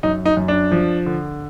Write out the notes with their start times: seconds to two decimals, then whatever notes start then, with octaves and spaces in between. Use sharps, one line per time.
0.03 F#2 D#4
0.26 D#4
0.37 F#2
0.48 D4
0.72 F3
1.06 D3